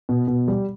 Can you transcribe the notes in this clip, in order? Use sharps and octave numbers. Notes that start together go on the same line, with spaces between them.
B2
B2
G3